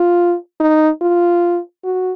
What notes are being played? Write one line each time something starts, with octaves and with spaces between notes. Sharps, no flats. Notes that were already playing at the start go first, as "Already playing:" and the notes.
Already playing: F4
D#4
F4
F#4